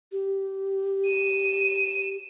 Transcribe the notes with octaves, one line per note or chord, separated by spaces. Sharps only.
G4
D#7 E7